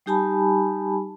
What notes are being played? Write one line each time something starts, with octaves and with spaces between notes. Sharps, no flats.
G3 D#4 G4 G#5 A5 B5